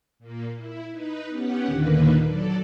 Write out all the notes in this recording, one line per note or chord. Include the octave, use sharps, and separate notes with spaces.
A#2 A#3
E4
D#4 B4
B3 C#4 G4 F#5
D#2 A#2 D3 D#3 A#3 B4
F#3 A4 D5